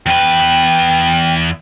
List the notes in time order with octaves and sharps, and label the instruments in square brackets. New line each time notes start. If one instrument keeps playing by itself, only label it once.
[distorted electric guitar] E2 B4 [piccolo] G5